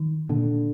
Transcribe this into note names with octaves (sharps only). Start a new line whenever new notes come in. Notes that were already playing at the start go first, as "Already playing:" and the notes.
Already playing: D#3
A#2 D3